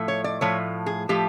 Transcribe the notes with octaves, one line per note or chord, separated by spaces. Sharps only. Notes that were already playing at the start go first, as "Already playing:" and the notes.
Already playing: A2 F3 A3
C#5
D5
A2 F3 A3 C#5
G#4
A2 F3 A3 G4